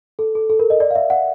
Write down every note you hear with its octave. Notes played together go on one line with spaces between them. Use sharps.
A4
A4
A4
A#4
D#5
D5
F5
E5
F#5